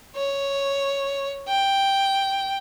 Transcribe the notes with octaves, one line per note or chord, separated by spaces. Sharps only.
C#5
G5